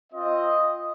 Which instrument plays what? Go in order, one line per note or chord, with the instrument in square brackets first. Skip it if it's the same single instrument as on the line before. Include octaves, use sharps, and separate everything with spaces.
[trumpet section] C4 F4 D#5